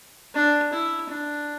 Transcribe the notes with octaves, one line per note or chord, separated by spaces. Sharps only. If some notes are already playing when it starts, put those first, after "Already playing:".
D4
E4
D4